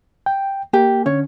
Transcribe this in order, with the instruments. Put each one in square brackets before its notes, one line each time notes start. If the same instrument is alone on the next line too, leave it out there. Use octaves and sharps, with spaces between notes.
[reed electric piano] G5
[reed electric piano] A#3 [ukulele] G4
[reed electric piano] D3 C#4 [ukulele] C#5